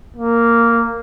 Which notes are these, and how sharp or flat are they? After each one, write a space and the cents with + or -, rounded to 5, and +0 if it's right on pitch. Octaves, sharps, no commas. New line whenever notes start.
A#3 -5